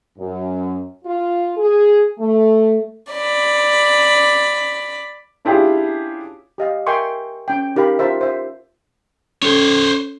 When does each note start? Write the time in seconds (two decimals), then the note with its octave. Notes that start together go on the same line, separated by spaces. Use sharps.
0.18 F#2
1.05 F4
1.56 G#4
2.19 A3
3.13 D5 B5
5.45 C#4 D4 E4 F4 G4 G#4
6.58 G4 D#5 F5
6.87 A#4 E5 G5 G#5 C6 C#6
7.48 C#4 G5
7.76 D#4 G4 A#4 F5 B5
7.99 F4 C5 E5
8.21 C5 E5
9.42 C#4 A4 C5 C#5